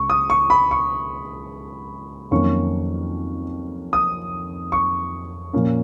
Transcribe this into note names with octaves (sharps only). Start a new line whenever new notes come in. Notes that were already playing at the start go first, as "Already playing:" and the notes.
Already playing: C#2 C#3 C#6
D#6
C#6
B5
C#6
F2 D#3 F#3 A#3 C#4 C#6
D#6
C#6
A#2 F3 A#3 C#4